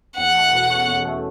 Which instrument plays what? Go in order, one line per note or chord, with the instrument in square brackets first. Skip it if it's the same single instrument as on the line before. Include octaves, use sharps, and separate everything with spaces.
[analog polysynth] E2 [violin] F#5
[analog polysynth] A3
B2
C#4
E2
A3